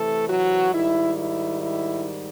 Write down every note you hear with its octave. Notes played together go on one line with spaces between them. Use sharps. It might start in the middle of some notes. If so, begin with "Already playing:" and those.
Already playing: C3 E3 A3 A4
F#3 F#4
G#2 D#3 G3 E4
E4
E4